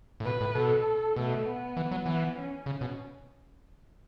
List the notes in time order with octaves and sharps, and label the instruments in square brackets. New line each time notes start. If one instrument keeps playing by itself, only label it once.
[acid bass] A2
[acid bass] B2 [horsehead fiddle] B4
[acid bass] A2
[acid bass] B2 [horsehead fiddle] A4
[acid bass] B2 [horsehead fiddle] A3
[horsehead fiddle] B3
[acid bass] E3
F#3
E3
[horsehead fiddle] C#4
[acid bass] C#3 [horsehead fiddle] C#4
[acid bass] B2